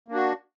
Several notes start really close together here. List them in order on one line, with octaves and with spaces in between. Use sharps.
A#3 D4 F#4